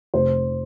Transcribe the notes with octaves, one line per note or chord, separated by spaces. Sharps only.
F1 C5